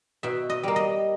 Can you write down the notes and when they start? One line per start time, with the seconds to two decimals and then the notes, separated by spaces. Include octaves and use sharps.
0.23 B2 E5
0.50 D#5
0.63 G3 A#3
0.76 D#5